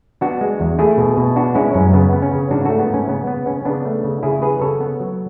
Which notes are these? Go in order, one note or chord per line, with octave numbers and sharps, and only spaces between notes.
B3 D4 F#4
G#3
E2
A3 E4 G#4
B2
B2
B3 D4 F#4
G#3 C#4 E4
F#2 C#4
C#3 B3
B3
C#4
C#3
G#2 D4 F#4
A3 F#4 A4
B3
G#2 C#4
C#3 B3
B3
C#3 C#4
C#4
C#3 B3 D4
A3
C#3
C#3 E4 G#4
B3 G#4 B4
C#3 A4 C#5
B3
F#3